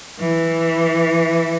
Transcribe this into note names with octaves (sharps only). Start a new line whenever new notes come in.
E3